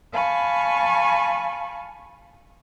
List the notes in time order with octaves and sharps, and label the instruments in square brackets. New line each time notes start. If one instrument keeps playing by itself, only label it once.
[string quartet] F5 G#5 A5 B5 C#6